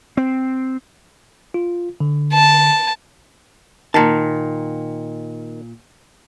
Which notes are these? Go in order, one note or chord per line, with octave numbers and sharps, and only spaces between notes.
C4
F4
D3
A5
A#2 D#3 A5